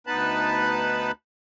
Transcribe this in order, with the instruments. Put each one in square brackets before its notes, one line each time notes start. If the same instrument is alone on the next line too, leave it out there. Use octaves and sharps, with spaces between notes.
[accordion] D2 B3 D#4 B4 A5 B5